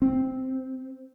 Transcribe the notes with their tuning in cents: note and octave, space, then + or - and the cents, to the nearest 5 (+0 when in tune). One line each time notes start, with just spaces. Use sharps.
C4 -5